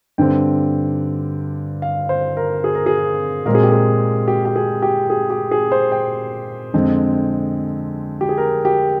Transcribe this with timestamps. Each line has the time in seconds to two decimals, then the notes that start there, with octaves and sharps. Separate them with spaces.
0.18 G2 D3 G3 C4 G5
1.82 F5
2.09 C5
2.37 A#4
2.64 G#4
2.75 A#4
2.86 G#4
3.46 A#2 G#3 C4 A#4
3.55 G#4
3.63 G4
3.72 G#4
4.28 G4
4.45 G4
4.56 G#4
4.82 G4
5.10 G#4
5.30 G4
5.51 G#4
5.72 C5
5.92 G5
6.74 F2 D3 G#3 C4
8.21 G4
8.29 G#4
8.38 A#4
8.65 G4